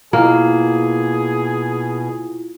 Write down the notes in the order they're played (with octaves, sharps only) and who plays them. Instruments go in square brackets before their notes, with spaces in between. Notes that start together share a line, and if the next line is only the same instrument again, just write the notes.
[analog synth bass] B2 [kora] A#3 [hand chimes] E4 F4 [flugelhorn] G#4